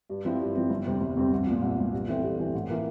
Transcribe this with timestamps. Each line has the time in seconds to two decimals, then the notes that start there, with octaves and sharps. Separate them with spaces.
0.10 G2
0.25 F3 C4 E4
0.40 G2
0.55 F3 C4 E4
0.70 G1
0.86 F2 C3 G3 C4
1.01 G1
1.17 F2 C3 G3 C4
1.32 C2
1.46 A#2 F3
1.62 C2
1.77 A#2 F3
1.93 G2
2.08 E3 A3 C4
2.23 G2
2.39 E3 A3 C4
2.55 A1
2.70 E3 A#3 F4